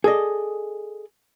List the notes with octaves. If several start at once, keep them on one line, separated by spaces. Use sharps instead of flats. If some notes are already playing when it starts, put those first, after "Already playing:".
G#4 A4 D5 D#5